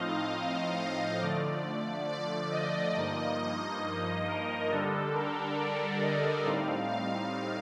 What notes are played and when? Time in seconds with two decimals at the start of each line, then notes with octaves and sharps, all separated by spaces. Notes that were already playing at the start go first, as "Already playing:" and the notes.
Already playing: A2 F3 C4 D#4 D#5 F5
0.33 D#5
1.21 D3 F3 A3 D5
2.09 D5
2.52 D#5
2.96 G2 F3 A#3 D#4
4.27 A#4
4.70 D3 G3 D4 A4
5.14 A#4
5.58 D5
6.02 D#5
6.45 A2 G3 C4 D#4 F5
6.88 F5